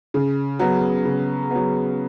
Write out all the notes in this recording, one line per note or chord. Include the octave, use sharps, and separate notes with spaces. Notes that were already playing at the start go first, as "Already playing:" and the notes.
C#3
F#3 B3
C#3
F#3 B3